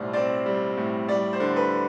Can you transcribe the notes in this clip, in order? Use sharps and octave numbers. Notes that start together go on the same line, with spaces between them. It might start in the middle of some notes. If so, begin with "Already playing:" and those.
Already playing: B1 A2 G3 C5 D5
C4 D5
G3
A2
G3 D5
C5
D3
B4